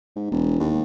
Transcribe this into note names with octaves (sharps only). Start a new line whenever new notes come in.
G#2
E1
D#2